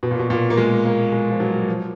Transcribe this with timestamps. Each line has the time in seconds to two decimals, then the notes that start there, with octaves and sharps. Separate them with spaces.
0.03 B2
0.11 A#2
0.19 B2
0.30 A#2
0.50 A#3
0.57 G#3
0.85 A#3
1.12 G#3
1.31 F3
1.40 F#3
1.68 F3